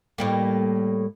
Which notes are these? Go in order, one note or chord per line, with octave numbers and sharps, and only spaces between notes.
A2 G3 A#3